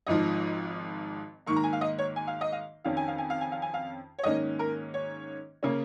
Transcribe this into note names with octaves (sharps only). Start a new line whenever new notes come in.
G#1 G#2 F3 D#5
G#2 D#3 A#3 C#6
A#5
G#5
F5
D#5
C#5
G#5
F5
D#5
F5
F2 D#3 C#4 F5
G#5
F5
G#5
F5
G#5
F5
G#5
F5
C#5
G#2 D#3 A#3 C#4 D#5
A#4
C#5
C#3 A#3 C#4